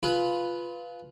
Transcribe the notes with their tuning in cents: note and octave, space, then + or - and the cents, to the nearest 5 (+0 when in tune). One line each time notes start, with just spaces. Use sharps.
F4 +0 G#4 +40 B4 +0